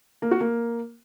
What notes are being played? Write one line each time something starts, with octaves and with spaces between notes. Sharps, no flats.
A#3
F#4
A#3